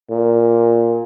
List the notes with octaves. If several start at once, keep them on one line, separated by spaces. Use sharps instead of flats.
A#2